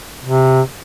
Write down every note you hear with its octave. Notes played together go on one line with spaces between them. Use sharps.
C3